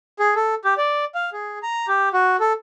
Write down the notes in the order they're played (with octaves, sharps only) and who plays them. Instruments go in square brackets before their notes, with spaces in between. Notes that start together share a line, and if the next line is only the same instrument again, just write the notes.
[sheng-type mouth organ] G#4
A4
G4
D5
F5
G#4
A#5
G4
F#4
A4